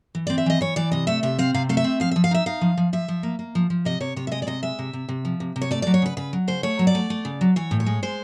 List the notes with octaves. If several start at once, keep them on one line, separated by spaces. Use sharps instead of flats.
E3
C4 D5
E5
E3 D#5
E3 C#5
E3 D5
C3 D#5
A3 E5
C3 E5
C4 F5
C3 F5
A3 F5
E5
C4
F3 F5
F3 E5
F5
D#4 E5
D#4 F5
F3
F3
F3 E5
F3
A#3
A#3
F3
F3
C3 D#5
C3 C#5
C3 C#5
E5
G#3 D#5
D5
C3 D#5
G#3 E5
C3
C3
C3
F3
C3
C3
C#5
A3 D5
F#3 D5
C#5
C#3 B4
C#3 B4
F#3
C#3 C5
A3 C#5
F#3
D5
A3
A3
C#3
F#3
E3 C#5
A2
C#5
G#3
G#3 C5